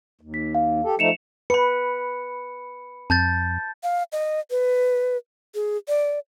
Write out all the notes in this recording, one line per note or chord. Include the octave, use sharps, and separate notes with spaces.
D#2
B6
F5
G4 A4
F3 A3 D#4 C#7 E7 F7
B4 B5 C#7
F2 A5 G6 A6
F5
D#5
B4
G#4
D5